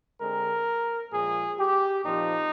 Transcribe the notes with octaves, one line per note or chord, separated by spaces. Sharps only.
D3 G#3 C4 A#4
A#2 F3 G#3 G#4
G4
A#2 F3 C4 D#4